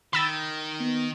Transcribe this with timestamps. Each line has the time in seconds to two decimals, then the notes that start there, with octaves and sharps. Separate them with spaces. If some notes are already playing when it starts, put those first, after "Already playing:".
0.13 D#3 B5 E6 A6
0.80 B3